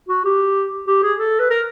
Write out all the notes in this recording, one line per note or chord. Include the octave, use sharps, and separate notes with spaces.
F#4
G4
G4
G#4
A4
B4
A#4